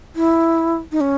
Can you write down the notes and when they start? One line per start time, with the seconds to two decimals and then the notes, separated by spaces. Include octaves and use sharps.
0.16 E4
0.92 D#4
1.01 C#4